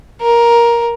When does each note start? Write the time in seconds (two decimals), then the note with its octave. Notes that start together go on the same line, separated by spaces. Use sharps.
0.21 A#4